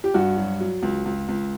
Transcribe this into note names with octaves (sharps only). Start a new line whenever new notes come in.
G4
G2 F#4
F#3
F#3
C#2
C#2
C#2